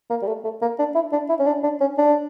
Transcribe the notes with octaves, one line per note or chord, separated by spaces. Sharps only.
A#3
G3
A3
A3
A#3
D4
E4
D4
E4
C#4
D4
D4
C#4
D4